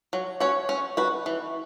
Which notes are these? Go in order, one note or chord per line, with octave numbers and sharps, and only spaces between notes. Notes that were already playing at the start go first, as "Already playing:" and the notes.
F#3
C#4 F#4 C#5
C#4
F#4 B4
E3